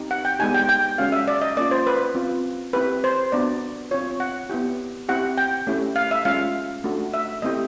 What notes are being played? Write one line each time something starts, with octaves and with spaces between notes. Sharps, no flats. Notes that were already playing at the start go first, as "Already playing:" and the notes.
Already playing: C4 D#4 G4
F#5
G5
G#3 B3 D#4 G4 G#5
G5
G5
G#3 C#4 F#4 F5
E5
D5
D#5
A#3 C#4 F4 D5
C5
B4
C4 F4
C4 E4 G4 B4
C5
B3 D4 F#4 D5
C4 F4 C#5
F#5
B3 E4 G4
C4 E4 G4 F#5
G5
A3 C#4 E4 G4
F5
E5
G#3 C#4 F4 F5
A3 D4 F#4
E5
A3 C4 E4 G4 D#5